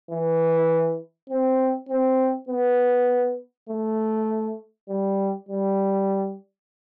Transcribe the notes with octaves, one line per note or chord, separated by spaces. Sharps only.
E3
C4
C4
B3
A3
G3
G3